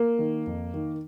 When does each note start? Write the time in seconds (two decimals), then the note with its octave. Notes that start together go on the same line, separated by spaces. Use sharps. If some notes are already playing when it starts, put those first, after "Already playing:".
Already playing: A#3
0.19 D#3
0.47 F2
0.74 D#3